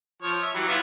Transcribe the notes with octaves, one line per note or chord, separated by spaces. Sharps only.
F3 C#5
E5
E3 F#3 G3
B3 E4 F4